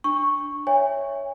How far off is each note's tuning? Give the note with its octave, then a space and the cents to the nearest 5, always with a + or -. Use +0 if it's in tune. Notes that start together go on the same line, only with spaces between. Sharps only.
D4 +0 C#6 -5
C#5 +0 E5 +0 G#5 -30